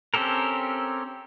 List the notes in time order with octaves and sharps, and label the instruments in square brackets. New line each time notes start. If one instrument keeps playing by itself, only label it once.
[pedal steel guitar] C4 C#4 G4 A4 A#4